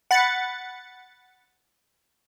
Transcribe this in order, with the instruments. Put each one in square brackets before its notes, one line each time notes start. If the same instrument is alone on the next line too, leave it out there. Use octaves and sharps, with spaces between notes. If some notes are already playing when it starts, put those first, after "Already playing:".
[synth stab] F#5 B5 A6 C#7